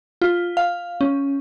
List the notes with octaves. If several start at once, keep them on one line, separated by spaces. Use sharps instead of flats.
F4
F5
C#4